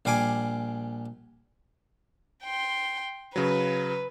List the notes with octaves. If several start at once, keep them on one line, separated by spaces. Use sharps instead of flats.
A#1 G3 F5 G#5 D6
G5 C6
C#3 F#3 B4